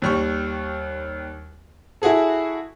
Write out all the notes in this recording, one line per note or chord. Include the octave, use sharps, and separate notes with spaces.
D#2 G3 C#6
E4 F#4 G#4 A4